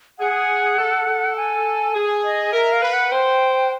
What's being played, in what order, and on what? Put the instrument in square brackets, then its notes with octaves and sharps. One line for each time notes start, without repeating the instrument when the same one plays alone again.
[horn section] G#4 [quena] F#5
[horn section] A4
A4
[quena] G#5
[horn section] G#4
[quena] D#5
[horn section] A#4 [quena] E5
[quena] F5
[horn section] B4
[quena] F#5
[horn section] C5 [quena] G5